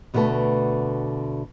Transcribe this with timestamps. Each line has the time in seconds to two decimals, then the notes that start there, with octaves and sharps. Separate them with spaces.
0.14 D2 B2 D3 D#3 A3 B4